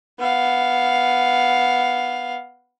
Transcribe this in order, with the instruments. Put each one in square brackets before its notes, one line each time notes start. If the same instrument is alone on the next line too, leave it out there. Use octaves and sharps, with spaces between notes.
[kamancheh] B3 F5